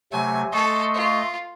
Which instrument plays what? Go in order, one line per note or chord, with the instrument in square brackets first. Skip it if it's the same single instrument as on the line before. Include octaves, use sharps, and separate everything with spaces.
[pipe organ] C3 F#3 A3 [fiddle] G#5
[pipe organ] A3 D#5 C6 [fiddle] A4 [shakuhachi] C#6
[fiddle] F4